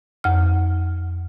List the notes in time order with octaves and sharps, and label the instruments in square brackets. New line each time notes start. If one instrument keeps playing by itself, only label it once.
[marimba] F2 F6